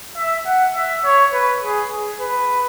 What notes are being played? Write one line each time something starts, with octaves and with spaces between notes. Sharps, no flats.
E5
F#5
E5
C#5
B4
G#4
G#4
B4